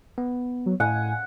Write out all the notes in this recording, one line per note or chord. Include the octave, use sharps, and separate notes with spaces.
B3
F#3
A2 F#5 G#5